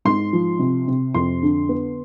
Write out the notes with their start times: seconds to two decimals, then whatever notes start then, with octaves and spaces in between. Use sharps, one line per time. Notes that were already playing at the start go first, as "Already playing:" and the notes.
0.05 G#2 C6
0.33 F3
0.59 C3
0.88 C3
1.14 F2 C6
1.43 D3
1.69 B3